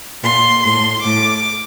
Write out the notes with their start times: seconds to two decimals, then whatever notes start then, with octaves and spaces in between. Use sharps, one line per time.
0.23 A#2 C6
0.64 A2 C6
1.05 A2 D6